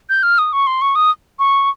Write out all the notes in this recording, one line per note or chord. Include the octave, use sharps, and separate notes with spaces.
G6
F6
D#6
C#6
C6
C#6
D#6
C#6